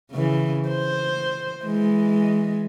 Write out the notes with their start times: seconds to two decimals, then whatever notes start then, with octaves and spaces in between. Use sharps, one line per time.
0.12 C#3 E3
0.69 C5
1.64 E3 G#3